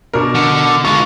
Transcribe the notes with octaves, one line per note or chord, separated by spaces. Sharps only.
B2 D4 A#4
D3
G#3 F4 C#6